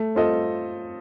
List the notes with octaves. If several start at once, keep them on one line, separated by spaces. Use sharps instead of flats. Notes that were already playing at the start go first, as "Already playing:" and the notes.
Already playing: A3
C4 F4 A4 D#5